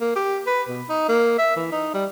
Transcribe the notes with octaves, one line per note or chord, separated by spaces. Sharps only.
A#3
G4
B4
B2
D#4
A#3
E5
E3
D#4
G3